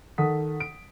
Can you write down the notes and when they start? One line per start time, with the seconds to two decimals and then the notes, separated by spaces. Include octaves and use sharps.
0.18 D#3 A4 F#5 D#6 B6
0.60 D7